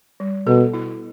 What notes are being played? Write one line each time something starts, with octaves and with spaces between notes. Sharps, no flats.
G3
B2 A4
E4